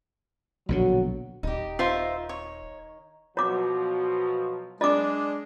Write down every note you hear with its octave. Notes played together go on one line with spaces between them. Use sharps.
A#1 B2 D3 F#3
D#1 D#4 G4
D#3 D#4 F4 C5 E5
C#5
B2 F3 F#3 C#5 D6
G#3 D4 D#5 D6